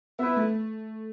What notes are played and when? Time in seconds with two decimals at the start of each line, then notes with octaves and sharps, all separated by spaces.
0.18 B3 E4 B4 E5
0.36 A3